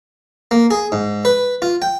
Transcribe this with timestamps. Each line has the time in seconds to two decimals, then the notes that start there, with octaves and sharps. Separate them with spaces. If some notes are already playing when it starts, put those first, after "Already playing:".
0.51 A#3
0.71 G#4
0.92 G#2
1.25 B4
1.62 F4
1.82 G5